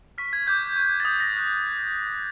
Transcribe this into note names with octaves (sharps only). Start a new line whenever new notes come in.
C#6 F6 B6
G#6
D6 F#6 G6
C#6 F#6
A6
D#6 G6 G#6
A#6
C#6 F#6